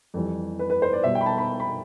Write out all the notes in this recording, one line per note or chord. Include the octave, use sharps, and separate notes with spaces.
F2 E3 G3
B4
B4
C5
D5
B2 G3 E5
G5
B5
A5
B5
B5